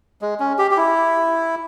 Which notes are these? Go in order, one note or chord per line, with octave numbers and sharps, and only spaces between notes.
G#3
C#4
G4
G4
E4